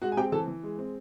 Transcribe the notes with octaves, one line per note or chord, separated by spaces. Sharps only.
G#3 F#4 F#5
G#5
C4 G4 G5
E3 A4 A5
E3
G#3
C4